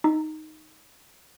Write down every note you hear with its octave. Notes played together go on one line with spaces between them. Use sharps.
D#4